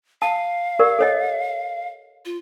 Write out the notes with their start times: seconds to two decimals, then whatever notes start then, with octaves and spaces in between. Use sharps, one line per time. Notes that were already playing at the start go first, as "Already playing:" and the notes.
0.22 F5 A5
0.79 G4 A#4 D5
0.99 A4 C#5 D#5
2.25 F4